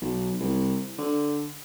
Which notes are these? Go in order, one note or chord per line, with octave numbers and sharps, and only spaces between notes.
B1
C2
D3